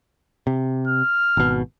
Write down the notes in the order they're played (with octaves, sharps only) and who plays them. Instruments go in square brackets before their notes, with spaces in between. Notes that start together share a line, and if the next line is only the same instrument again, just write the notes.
[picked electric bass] C3
[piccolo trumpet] F6
[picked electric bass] G#1 B2